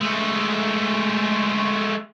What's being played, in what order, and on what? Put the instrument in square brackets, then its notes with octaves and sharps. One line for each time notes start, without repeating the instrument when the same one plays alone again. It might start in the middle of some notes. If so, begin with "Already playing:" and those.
[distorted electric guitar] G#3 A3